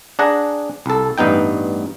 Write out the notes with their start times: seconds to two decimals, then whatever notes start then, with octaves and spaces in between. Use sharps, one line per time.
0.19 D4 G#4 F#5 A#5
0.86 C2 A4
1.18 A1 G2 B3 D#4 G5